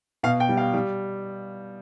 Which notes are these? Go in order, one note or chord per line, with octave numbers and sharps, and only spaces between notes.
B2 F5
G5
G3
F5
G3